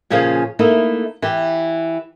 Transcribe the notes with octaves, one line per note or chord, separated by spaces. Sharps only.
A#2 C#3 F3 C#4 G#4 F5
A3 A#3 D#4 E4
E3 G4